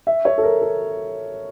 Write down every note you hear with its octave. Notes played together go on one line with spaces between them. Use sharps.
E5
C#5
A4
A#4
A4